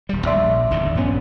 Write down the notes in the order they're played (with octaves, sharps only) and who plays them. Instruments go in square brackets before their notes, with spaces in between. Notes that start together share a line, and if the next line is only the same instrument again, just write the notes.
[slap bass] D#1 G3
[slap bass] A#1 [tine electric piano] D5 E5 C6
[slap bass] G1 E2 D#3
[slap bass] A#1 B3 [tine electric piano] G2 C#4